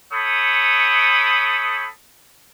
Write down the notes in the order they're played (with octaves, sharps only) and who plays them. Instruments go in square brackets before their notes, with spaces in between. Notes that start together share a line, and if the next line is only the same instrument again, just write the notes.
[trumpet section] A4 C#5 G5 B5 D#6